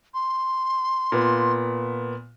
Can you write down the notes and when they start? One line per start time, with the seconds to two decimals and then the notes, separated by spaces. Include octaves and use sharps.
0.14 C6
1.12 A#2 B3